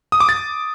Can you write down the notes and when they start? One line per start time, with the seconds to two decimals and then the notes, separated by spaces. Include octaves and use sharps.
0.12 D#6
0.20 D6
0.29 A6